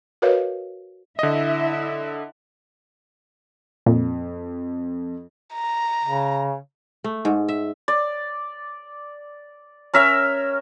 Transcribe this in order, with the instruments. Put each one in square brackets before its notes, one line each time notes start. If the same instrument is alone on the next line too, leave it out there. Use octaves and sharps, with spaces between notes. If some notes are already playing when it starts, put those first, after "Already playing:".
[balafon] F#4 A#4 B4 C#5 D#5 F5
[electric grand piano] D3 D#5 [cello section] E4 E5
[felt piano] F2 [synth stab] A#2
[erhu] A#5
[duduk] C#3
[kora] A3
G#2
E5
[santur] D5
C#4 A#4 E5